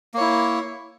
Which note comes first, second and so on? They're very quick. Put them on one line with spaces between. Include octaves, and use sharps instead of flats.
A#3 C#5 E4